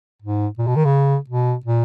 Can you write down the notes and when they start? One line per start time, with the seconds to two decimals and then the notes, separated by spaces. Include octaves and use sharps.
0.22 G#2
0.58 A#2
0.67 B2
0.76 D#3
0.85 C#3
1.30 B2
1.65 A#2